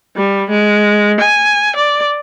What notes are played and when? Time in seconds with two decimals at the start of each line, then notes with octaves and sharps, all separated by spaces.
0.16 G3
0.50 G#3
1.20 G#5
1.76 D5